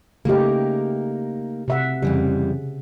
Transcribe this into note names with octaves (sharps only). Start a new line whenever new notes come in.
C#3 A3 A#3 D#4 G4
C3 E5 F#5
F2 C#3 E3 G3